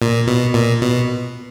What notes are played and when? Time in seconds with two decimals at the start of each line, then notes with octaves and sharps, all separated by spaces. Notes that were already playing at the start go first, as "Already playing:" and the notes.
0.02 A#2
0.27 B2
0.54 A#2
0.82 B2